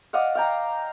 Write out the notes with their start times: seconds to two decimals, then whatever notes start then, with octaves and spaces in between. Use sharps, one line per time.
0.13 D5 D#5 F5 F#5
0.35 F5 G5 A#5